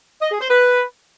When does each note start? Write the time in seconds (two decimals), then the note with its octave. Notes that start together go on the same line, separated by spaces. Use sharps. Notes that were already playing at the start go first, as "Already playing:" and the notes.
0.22 D#5
0.31 G#4
0.41 C5
0.50 B4